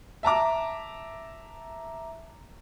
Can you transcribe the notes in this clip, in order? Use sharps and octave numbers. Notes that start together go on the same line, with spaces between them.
E5 A5 A#5 D6